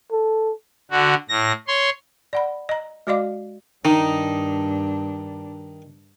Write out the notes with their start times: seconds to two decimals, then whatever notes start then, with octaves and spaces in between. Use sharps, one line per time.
0.11 A4
0.91 D3 F#4
1.29 A2 A#6
1.68 C#5 C6
2.33 D5 F#5 B5
2.69 D#5 A#5
3.07 G#3 F#4 D5 D#5 F5 D6
3.85 G2 D#3 D4 D#4